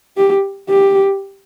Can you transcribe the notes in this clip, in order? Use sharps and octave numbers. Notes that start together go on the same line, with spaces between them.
G4
G4